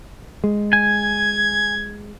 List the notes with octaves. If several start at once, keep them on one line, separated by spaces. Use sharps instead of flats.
G#3
G#5 G#6